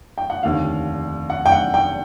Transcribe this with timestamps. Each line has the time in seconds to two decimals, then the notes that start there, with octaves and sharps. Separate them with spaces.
0.18 G5
0.30 F#5
0.43 F1 D#2 D3 F5
1.30 F#5
1.46 G5
1.52 F#5
1.74 G5